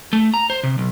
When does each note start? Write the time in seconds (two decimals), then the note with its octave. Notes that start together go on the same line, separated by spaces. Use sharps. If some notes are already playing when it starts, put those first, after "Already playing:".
0.13 A3
0.34 A#5
0.50 C5
0.63 C3
0.78 B1